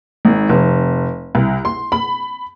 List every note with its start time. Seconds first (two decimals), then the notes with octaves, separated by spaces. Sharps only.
0.25 G#1
0.49 F1
1.35 C2
1.65 C6
1.92 B5